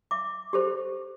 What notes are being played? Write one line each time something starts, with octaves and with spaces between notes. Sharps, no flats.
E5 D6
G4 A4 C5